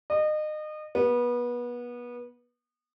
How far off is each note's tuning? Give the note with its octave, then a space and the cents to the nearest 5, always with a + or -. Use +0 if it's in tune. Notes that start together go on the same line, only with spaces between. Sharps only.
D#5 -30
B3 -25